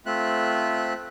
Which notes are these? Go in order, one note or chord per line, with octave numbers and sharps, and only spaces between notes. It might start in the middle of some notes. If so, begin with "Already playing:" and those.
A3 C4 F4 E5 F#6